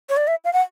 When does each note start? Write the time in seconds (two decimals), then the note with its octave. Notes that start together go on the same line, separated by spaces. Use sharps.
0.09 C#5
0.16 D5
0.27 E5
0.44 F5
0.53 F#5